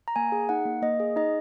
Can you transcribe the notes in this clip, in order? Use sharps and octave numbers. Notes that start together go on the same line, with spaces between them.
A#5
A#3 G#5
G#4
D#4 F#5
A#3
A#3 D#5
G#4
D#4 D#5